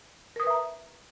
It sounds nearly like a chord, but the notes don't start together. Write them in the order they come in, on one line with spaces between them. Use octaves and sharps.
A#4 D#6 B4 E5 A#5